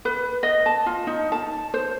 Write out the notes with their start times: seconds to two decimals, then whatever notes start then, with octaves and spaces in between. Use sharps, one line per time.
0.05 B4
0.43 D#5
0.66 A5
0.86 F4
1.07 D#4
1.32 A5
1.74 C5